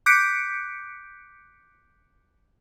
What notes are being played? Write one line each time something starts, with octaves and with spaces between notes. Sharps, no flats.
D6 F#6 G6 B6 C#7 D7